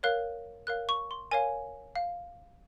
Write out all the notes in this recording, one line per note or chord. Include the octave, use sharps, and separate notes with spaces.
A#4 C#5 F5 F#6
A#4 C#5 F5 F#6
C#6
C6
A#4 C#5 F5 G#5
F5